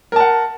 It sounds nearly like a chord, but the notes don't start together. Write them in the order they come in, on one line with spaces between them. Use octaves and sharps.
A#4 A5 F#5